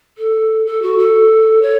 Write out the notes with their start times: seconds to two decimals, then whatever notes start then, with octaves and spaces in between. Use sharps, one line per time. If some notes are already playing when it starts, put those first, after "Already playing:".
0.17 A4
0.66 A4
0.82 F#4
0.97 A4
1.62 C#5